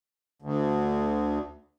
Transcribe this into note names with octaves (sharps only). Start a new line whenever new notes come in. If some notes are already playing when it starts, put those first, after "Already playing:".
D2